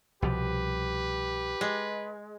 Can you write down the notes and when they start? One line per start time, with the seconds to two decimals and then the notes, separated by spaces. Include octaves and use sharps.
0.22 C2 B2 F3 G4 B4
1.61 G#3